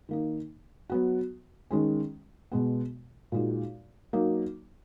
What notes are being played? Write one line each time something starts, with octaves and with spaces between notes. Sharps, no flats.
D#3 A#3 D#4
F#3 B3 F#4
D#3 G#3 C#4
B2 G#3 B3
A#2 G#3 D#4 F#4
F#3 A#3 D#4